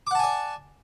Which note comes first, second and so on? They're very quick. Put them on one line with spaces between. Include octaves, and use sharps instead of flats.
D6 F#5 A5 G#5 D5